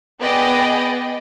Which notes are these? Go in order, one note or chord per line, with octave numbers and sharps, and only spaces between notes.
B3 G#4 D5 D#5 G5